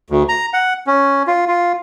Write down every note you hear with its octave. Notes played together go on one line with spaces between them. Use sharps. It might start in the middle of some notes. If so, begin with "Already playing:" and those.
D2
A#5
F#5
C#4
F4
F4